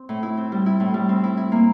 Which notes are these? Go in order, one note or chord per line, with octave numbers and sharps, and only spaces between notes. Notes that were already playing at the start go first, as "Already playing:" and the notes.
Already playing: C4
A2
E4
C4
G3
E4
A2
G3
C4
E4
E4
A#3